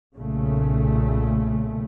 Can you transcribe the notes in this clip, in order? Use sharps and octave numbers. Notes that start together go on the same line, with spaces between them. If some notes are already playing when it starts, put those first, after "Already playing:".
B1 A#2 C#3 A3